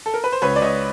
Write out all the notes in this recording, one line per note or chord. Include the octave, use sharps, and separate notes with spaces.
A4
A#4
B4
C5
C#2 B4 C#5
D5
C#2 C#5 D#5